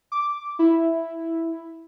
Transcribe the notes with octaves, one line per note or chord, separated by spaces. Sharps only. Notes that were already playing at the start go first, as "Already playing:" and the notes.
D6
E4